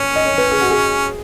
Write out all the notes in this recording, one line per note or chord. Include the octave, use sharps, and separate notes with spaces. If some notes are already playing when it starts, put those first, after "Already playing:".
Already playing: C#4 C#5
D#5
C#5
B4
G#4
F#4
G#4